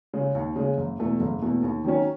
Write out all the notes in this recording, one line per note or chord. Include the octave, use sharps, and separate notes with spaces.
C#3 G#3
D#2
C#3 G#3
F#1
E2 B2 A3
F#1
E2 B2 A3
D#2
D#3 F#3 C#4